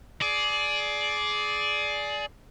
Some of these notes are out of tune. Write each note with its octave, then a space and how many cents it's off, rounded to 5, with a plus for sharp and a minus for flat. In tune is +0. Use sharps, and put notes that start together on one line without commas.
G#4 +20 D5 +0